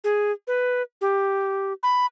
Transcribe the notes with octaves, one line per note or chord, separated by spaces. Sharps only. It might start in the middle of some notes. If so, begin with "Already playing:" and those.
G#4
B4
G4
B5